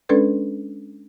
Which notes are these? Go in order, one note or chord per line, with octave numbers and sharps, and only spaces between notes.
G#3 C#4 D4 A4 B4 D5